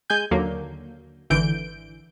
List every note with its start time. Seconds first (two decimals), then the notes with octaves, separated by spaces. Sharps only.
0.10 G#3 G#5 G6
0.31 D#2 D3 F#3 A#3
1.30 G#1 D3 E3 G6 D7